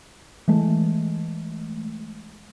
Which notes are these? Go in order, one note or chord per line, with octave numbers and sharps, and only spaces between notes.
E3 G#3 A3